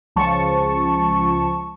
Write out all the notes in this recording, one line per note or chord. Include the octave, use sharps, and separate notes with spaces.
C#2 F3 A5 C#6